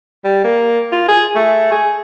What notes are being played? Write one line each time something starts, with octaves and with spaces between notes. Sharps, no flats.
G3
A#3
F4
G#4
A3
G#4